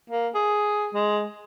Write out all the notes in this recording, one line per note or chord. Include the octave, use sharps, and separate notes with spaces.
A#3
G#4
G#3